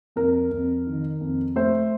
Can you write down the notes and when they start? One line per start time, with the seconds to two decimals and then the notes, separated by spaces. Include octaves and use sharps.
0.16 F2 A#4
0.51 F2
0.87 D#3
1.21 F2
1.56 A3 C5